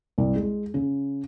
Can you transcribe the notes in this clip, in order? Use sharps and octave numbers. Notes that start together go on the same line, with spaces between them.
C2
G#3
C#3